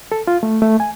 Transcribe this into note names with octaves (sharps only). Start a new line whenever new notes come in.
A4
F4
A3
A3
G#5